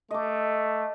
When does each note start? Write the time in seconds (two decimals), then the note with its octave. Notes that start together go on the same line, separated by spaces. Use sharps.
0.11 A3 D#5 D6